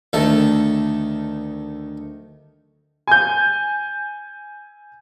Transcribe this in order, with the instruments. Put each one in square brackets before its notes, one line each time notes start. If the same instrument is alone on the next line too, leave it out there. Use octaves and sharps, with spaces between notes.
[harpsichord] D2 D#3 A3 A4
[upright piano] G#5 G6